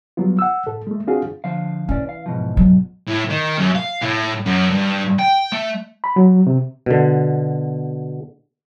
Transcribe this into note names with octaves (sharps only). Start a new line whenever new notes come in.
F#3 G3 B3 F4
F#5 E6
A2 A4
G#3 A3
C4 D4 F4 F#4 G#4 F5
D3 F3 F5
E3 C#4 D5
F5
G#2 B2 F3
F#3
A2
D#3
F#2
F5
A2
F#2
G2
G5
A3
B5
F#3
C3
B2 D3